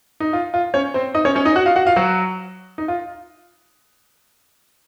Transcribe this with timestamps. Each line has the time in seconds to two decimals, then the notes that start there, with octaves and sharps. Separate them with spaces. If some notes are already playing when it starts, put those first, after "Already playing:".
0.20 D#4
0.33 F4
0.54 F4
0.74 C#4 C#5
0.94 C4 C5
1.14 D#4 D#5
1.25 C#4 C#5
1.35 C#4 C#5
1.45 D#4 D#5
1.56 F#4 F#5
1.66 F4 F5
1.76 F#4 F#5
1.87 F4 F5
1.96 F#3 F#4
2.78 D#4
2.88 F4